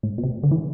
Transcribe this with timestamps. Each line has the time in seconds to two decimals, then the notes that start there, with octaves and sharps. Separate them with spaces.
0.03 A2
0.18 B2
0.23 C3
0.43 D3
0.51 E3